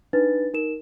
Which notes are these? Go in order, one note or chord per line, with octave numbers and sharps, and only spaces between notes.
D4 D#4 B4 A6
D#4 A#4 E7